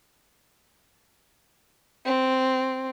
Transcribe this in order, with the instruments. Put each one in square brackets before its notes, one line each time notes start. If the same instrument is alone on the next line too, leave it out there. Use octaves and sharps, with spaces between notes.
[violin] C4